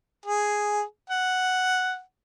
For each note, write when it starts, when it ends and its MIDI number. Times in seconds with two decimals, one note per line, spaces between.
0.26 0.82 68
1.10 2.00 78